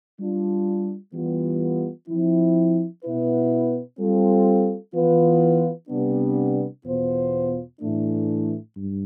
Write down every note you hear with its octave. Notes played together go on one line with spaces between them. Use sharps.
G3 D4 F4
E3 G3 B3 F4
F3 C4 E4
B2 B3 E4 B4
G3 C4 F4 A4
E3 B3 F4 B4
C3 G3 B3 D4
E2 B2 B3 F4 C5
A2 E3 A3 D4
G2